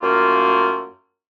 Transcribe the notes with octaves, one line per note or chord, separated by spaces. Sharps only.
F#2 A3 A#3 F4